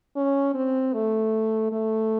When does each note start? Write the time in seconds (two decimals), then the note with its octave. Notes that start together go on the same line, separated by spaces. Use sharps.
0.16 C#4
0.54 C4
0.93 A3
1.72 A3